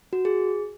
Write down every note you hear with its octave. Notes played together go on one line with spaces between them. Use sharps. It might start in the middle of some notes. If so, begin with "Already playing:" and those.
F#4
G#4